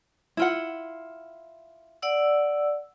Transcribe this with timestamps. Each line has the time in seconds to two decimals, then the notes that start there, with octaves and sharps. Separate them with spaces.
0.37 E4 F4 F#5
2.02 D5 F#5 E6